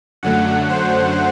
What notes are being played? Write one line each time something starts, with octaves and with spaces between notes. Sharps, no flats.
F#2 D3 F#3 A3 F#5
C5